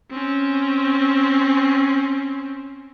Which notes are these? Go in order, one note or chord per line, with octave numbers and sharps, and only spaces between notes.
C4 C#4